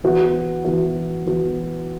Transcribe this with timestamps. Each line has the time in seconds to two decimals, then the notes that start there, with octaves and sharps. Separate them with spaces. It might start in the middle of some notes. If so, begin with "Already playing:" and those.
0.03 E3 B3 F#4
0.65 E3 B3 F#4
1.26 E3 B3 F#4